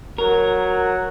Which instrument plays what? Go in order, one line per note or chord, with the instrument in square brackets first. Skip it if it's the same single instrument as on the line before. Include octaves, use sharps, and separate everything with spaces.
[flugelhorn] F#3 [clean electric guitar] A#4